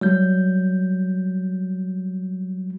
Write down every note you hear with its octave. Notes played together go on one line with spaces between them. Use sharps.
F#3 G3 G6